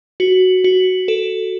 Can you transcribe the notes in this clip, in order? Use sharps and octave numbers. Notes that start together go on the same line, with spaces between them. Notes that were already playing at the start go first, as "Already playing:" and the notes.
F#4
F#4
A4